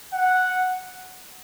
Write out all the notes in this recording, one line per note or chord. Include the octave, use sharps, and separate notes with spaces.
F#5